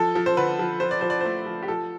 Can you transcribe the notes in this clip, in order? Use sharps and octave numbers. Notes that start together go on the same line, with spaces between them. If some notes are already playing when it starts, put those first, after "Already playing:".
Already playing: F3 A4
F3
C5
D3 B4
F3
F3 C5
D5
F3 C5
D5
A3 C5
F3
G4
F3 A4